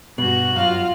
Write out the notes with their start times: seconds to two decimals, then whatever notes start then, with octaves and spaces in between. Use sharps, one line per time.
0.18 G2 B2 F#4 F#7
0.56 F#2 F4 F5